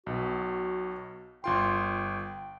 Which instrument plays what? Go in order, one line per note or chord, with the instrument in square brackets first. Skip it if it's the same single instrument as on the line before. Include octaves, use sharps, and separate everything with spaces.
[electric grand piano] B1 B2 [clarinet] F#4
[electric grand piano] G1 F4 C6 [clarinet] G5